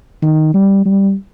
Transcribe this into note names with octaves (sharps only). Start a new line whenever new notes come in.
D#3
G3
G3